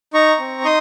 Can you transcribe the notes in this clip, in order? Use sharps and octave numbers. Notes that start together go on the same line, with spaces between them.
D#4 A#5 C#6
C4
D#4 C6 D#6